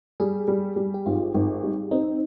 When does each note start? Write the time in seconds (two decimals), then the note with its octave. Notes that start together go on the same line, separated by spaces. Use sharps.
0.20 G3 G#4
0.48 G3
0.76 G3
0.94 G4
1.06 G#1 F4
1.34 G#1
1.63 G3
1.91 C4 D#4